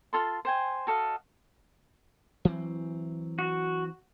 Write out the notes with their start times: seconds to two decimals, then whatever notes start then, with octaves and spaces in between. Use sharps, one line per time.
0.13 F4 A4 C6
0.45 C5 G5 G#5
0.87 F#4 A4 D#5 F5
2.45 E3 F#3 C4
3.39 F#4